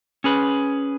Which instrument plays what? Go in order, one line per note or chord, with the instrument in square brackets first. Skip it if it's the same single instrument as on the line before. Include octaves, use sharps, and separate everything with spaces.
[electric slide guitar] C#4 G#4 B4